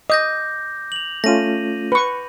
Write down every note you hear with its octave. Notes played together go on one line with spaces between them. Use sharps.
D#5 D6 G6 A#6
F7 F#7
A3 C#4 F4 A#6 D#7
B4 C#6